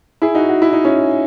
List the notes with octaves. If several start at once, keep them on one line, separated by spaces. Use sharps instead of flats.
E4 G#4
D#4 F#4
F#4
E4
D#4
C#4 E4